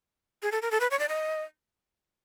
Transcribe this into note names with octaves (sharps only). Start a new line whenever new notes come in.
G#4
A4
A#4
A4
B4
C#5
D5
D#5